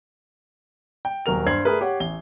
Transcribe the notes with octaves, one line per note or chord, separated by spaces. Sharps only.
G5
D#1 F#3 A#4 F7
G2 C5 G#6 C7 F#7
A3 G#4 A#4 B4
G4 C#5 F#5
A1 G7